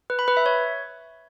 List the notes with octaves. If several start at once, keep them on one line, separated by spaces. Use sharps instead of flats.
B4
B5
B4
E5
C#5